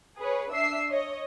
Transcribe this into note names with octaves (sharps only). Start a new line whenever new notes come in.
G#4 B4 C#5
D4 E5 E6 C7
C#5 D#5